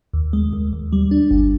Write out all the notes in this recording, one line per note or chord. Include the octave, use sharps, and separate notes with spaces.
D#2
G#3
D#2
D#2
G3
D4
G1